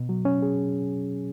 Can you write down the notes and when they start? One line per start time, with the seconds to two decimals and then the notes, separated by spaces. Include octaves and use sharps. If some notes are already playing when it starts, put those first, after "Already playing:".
Already playing: B2
0.09 F#3
0.25 C#4
0.42 G#4